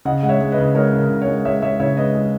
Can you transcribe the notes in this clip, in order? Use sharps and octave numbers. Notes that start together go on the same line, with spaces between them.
C#3 D#5 F#5
G#3 F#5
C#5 E5
G#3
B4 D#5
C#3
G#3 A#4 C#5
C#3
A#4
C#3
A#4 C#5
G#3
G#3 C#5 E5
G#3 C#5 E5
C#3 C#5 E5
G#3 B4 D#5
G#3